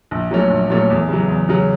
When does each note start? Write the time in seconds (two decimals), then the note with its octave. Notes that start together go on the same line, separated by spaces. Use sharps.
0.11 A#1
0.31 A#2 F#3 A3 C#4
0.50 A#1
0.70 A#2 F#3 A3 C#4
0.90 E2
1.08 C#3 F#3
1.29 E2
1.49 C#3 F#3